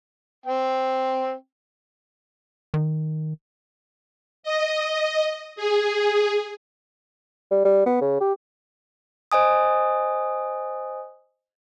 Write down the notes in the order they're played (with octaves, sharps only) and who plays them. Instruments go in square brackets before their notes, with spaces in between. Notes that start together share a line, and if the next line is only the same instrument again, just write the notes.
[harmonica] C4 G5
[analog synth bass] D#3
[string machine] D#5
G#4
[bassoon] G3
G3
B3
C#3
G4
[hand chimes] C5 D#5 G#5 D#6